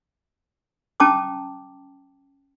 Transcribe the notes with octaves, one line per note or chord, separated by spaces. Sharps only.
C#4 G5 A5 A#5 D6 D#6